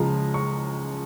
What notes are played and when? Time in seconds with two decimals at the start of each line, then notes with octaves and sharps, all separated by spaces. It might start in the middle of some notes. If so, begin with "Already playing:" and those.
Already playing: C#2 C#3 F3 G#3 A#5
0.34 C#6